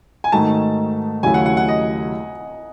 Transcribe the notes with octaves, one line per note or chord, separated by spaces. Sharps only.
G#5
G#2 D#3 A3 D#4 F#4 A5
D#2 C#3 F#3 A3 E4 G#5
F#5
F#5
F#5
D#5